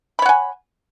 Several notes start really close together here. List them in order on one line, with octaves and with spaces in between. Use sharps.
B5 C#5 F#5 G#5